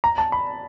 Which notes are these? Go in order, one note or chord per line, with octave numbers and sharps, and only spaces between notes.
A#5
A5
B5